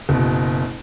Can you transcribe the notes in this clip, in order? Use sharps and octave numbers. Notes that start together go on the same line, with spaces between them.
F#1 B2